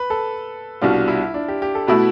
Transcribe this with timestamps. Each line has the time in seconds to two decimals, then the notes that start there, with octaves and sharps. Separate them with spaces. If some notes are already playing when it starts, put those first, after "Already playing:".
Already playing: B4
0.10 A4
0.82 C2 B2 G3 D4 F4
1.08 E4
1.34 D4
1.48 G4
1.62 G4
1.75 A4
1.87 B2 A3 E4 B4